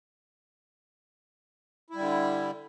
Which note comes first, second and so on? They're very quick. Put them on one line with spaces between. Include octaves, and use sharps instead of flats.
E4 G3 D3